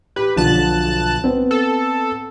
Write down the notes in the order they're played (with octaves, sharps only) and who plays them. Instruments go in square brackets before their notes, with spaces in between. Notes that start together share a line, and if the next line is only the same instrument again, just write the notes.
[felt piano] G4 [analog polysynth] B4
[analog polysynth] B1 A5 F#6 [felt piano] D3 F3
[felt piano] B3 C4
[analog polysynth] A4